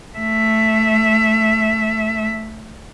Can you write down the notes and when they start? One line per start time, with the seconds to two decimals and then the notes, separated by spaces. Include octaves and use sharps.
0.18 A3 E5